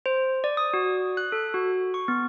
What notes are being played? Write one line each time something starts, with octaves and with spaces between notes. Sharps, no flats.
C5
D5
D#6
F#4
F#6
A4
F#4
C#6
B3